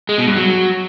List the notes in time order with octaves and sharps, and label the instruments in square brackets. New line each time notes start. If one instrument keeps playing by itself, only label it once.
[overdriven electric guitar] G#3
B2
G2
F#3